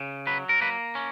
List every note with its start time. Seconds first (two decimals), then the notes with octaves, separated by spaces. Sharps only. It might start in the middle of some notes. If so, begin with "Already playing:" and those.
Already playing: C#3
0.27 F#3 B4
0.49 A#4
0.61 A#3 B4
0.95 C#4